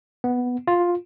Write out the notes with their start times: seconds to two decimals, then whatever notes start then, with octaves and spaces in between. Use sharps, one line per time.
0.24 B3
0.68 F4